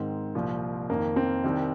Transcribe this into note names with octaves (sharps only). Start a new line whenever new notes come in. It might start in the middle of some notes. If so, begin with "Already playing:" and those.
Already playing: G#2 D#3 C4
C2 A#2 F3
F2 D#3 A#3
C4
C2 C3 D#3